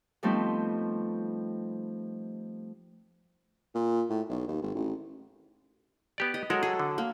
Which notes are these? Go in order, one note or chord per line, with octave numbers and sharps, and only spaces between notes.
F3 G3 A3 B3 C4 D#4
A#2
A2
B1
D#2
G#1
A1
B3 G4 D5
D#5
F#3 G#3 A4 A#4
G#4 A4
D3
A#3